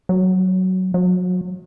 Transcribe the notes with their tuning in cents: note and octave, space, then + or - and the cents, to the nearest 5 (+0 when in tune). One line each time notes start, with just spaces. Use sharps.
F#3 +10
F#3 -30